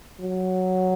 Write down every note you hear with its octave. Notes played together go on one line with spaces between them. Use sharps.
F#3